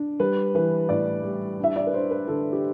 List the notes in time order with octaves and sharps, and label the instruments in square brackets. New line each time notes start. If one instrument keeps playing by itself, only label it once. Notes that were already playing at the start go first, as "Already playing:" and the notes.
Already playing: [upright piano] D4
G3 B4
E3 B4
A2 D5
G3
D4 E5
D5
B4
D4 C5
B4
D3 A4
G4